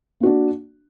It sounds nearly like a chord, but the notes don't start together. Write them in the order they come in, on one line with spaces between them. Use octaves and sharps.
A#3 F#4 D4